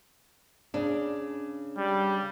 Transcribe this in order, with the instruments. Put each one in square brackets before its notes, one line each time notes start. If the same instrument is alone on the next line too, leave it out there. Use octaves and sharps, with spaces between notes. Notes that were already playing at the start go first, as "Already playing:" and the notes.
[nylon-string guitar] C#3 D4
[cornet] G3